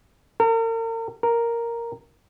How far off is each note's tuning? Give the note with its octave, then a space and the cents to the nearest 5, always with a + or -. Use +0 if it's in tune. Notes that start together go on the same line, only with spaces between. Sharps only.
A#4 -40
A#4 +0